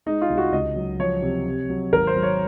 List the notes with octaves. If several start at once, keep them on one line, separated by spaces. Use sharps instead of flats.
G#3 D#4
F4
C2
F#4
C#2 D#5
F#3
F3 C#5
C3
C3
F#3
G#1 A#4
C5
F#3
C#5